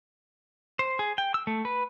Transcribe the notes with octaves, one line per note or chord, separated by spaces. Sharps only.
C5
G#4
G5
E6
A3
B4